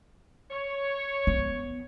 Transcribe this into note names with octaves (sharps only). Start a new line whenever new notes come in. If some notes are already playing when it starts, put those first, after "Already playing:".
C#5
B3